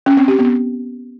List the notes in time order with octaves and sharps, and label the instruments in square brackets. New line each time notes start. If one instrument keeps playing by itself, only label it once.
[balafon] C#4
C4
G4
B3